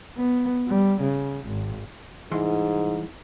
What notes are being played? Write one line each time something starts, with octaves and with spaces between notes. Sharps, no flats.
B3
G3
C#3
G#1
C2 G#2 E3 C6